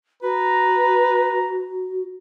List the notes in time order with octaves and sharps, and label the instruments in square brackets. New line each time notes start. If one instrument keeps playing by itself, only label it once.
[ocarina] F#4 [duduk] B4 [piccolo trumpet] A#5